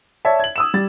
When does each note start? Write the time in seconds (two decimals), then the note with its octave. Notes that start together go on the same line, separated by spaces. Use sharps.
0.25 C#5 D5 E5 A5
0.40 G#6 F#7
0.56 D#6 E6 E7
0.74 G3 G4 A6